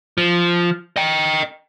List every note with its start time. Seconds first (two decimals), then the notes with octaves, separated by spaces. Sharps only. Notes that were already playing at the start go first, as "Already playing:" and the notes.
0.18 F3
0.96 D#5 G5